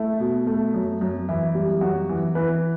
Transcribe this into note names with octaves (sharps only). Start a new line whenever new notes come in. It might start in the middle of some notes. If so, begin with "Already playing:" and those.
Already playing: A3 E4
B2
A3
F#2
F#2
E3 E4
G3
F#2 F#4
E3
E3 B4